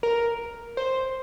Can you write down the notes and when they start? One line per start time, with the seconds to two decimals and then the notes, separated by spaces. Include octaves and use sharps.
0.03 A#4
0.77 C5